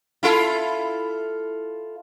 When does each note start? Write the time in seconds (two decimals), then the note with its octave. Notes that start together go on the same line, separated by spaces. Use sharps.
0.23 E4 F4 A4